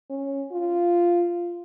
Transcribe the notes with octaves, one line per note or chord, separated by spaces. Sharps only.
C#4
F4